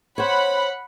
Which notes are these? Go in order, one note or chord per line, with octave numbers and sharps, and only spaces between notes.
C5 C#5 F#5 B5